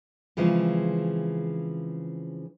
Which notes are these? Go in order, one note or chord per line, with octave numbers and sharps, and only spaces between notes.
C#3 E3 F3 G#3 C4